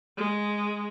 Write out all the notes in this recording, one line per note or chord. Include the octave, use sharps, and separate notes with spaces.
G#3